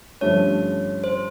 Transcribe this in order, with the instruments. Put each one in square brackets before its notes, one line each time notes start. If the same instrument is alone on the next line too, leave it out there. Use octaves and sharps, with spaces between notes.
[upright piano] G2 D3 F3 A3 C#4 [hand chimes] C#5
[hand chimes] C5